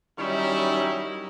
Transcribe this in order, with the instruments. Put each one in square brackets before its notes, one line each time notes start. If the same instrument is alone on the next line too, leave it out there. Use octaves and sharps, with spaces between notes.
[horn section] D#3 F#3 G3 C#4 D#4 E4